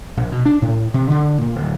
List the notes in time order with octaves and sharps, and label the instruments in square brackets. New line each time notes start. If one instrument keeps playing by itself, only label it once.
[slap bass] A#1
B2
D4
A2
C3
D3
A#2
D1